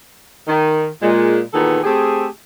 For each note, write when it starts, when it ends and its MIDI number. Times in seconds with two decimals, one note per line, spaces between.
0.48 0.87 51
1.02 1.40 46
1.02 1.40 56
1.53 1.79 46
1.53 1.79 51
1.53 1.79 52
1.53 1.79 59
1.53 1.79 68
1.53 1.79 69
1.84 2.25 57
1.84 2.25 60
1.84 2.25 67
1.84 2.25 68